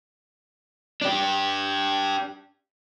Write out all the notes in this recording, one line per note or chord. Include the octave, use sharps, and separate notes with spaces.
D4 G4